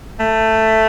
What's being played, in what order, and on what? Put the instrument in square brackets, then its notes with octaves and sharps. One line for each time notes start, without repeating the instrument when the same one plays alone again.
[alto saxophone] A3